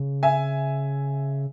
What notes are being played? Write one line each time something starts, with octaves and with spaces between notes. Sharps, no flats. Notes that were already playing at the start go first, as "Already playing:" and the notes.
Already playing: C#3
E5 G#5